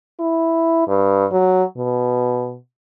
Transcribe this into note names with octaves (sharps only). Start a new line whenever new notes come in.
E4
G2
F#3
B2